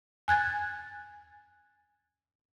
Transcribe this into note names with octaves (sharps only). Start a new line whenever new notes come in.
G#5 F#6 G#6 A6